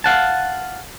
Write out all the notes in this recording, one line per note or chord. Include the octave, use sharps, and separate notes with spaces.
F5 F#5 A5